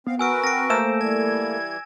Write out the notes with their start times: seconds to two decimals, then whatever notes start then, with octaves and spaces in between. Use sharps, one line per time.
0.07 B3 C4 F5
0.19 F#4 A#4 B4 G#5 E6 D7
0.44 C4 A#6 D7
0.70 A3 A#3 A4 C5 E6 E7
1.01 E3 G3 G#6